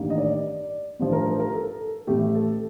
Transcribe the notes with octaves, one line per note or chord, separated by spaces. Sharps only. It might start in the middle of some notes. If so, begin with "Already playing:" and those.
Already playing: A1 G2 D#3 A#3
D#5
D5
A1 G2 F3
A#4
C5
A#4
A4
A4
A1 A2 A3 G4
A4